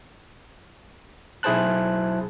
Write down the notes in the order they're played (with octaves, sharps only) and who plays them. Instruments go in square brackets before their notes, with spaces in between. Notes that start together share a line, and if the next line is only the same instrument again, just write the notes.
[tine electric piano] B1 E4 G#4 C5 A5 F#6